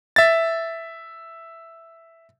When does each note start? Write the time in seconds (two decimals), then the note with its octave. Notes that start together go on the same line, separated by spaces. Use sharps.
0.16 E5 A6